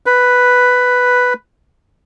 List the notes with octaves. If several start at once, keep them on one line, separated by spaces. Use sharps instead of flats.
B4